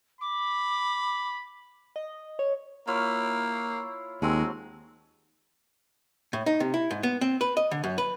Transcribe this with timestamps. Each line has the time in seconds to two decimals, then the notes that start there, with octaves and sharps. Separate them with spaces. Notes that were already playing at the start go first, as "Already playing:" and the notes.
0.21 B5 D6
1.96 D#5
2.39 C#5
2.87 A#3 E4 F4 C#5
4.22 D#2 F3 F#3 G#3 C4
6.33 A2
6.46 D#4
6.60 C3
6.74 E4
6.91 G#2
7.03 B3
7.21 C4
7.41 B4
7.57 D#5
7.71 D3
7.84 F#2
7.98 B4